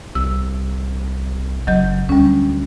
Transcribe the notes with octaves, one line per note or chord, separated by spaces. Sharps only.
C2 E6
F#1 F#3 D#5 G6
D2 G3 C#4